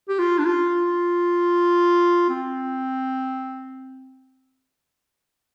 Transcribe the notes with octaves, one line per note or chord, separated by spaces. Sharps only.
G4
F4
D4
F4
C4